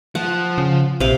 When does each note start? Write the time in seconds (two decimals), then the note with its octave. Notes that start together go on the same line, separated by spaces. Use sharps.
0.15 F3 F#5
0.58 C#3
1.00 A#1 C3 F5